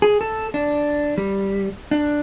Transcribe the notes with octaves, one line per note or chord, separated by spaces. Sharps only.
G#4
A4
D4
G3
D4